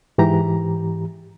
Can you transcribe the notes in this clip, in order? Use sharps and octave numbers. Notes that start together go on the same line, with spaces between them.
G#2 E3 G4 A#5